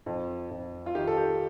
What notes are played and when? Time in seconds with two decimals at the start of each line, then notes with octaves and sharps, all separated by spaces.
0.06 F2
0.51 F2
0.86 F4
0.95 D#3 G4
1.07 A4
1.17 G4